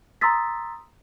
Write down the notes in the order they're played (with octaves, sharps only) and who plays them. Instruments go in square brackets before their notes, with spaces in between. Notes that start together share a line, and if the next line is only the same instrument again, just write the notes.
[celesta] A#5 C6 D#6 E6 A6 B6